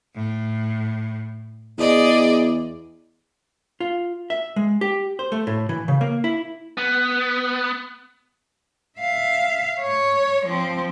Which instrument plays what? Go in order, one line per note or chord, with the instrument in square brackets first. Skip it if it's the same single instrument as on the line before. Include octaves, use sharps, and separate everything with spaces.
[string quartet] A2
[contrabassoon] E2 [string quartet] G#4 D5 D#5
[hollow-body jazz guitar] F4
E5
G#3
G4
C5
A3
A2
E3
C#3
A#3
E4
[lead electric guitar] B3
[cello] E5 F5
C#5
F3 C4